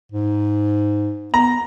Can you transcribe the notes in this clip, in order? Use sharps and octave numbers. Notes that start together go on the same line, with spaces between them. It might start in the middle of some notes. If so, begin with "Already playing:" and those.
G#2
B3 A#5